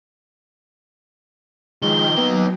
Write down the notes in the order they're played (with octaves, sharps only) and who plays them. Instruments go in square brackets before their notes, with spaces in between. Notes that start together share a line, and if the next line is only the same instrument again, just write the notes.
[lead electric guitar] D#3 F3 [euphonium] G#3 [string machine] D#5 G5 [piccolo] G7
[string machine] F#3 [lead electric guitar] A#3 D#4 [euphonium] B3